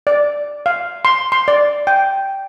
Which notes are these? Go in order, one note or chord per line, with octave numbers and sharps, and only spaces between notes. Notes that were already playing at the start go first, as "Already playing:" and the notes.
D5
F5
C6
C6
D5
G5